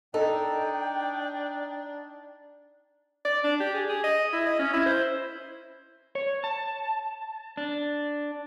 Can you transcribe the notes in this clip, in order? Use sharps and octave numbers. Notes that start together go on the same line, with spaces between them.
D4 D#4 A4 G5
D5
D4
G4
G#4
G#4
D#5
E4
D#5
C#4
E4
C5
C#5
A5
D4